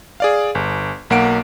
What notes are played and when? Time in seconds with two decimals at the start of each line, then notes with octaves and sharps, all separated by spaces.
0.20 G#4 D5 F5
0.55 G1
1.10 B1 A#3 F#5 D7